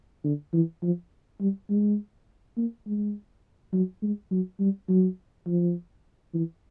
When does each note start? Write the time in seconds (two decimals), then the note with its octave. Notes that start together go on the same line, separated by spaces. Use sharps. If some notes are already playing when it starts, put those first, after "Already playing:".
0.24 D3
0.53 E3
0.83 F3
1.41 G3
1.70 G#3
2.57 A#3
2.86 G#3
3.73 F#3
4.02 G#3
4.31 F#3
4.60 G3
4.89 F#3
5.47 F3
6.34 E3